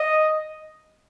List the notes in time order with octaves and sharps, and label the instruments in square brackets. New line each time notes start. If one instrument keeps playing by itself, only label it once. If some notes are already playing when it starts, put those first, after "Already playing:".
Already playing: [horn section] D#5